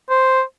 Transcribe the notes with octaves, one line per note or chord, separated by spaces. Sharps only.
C5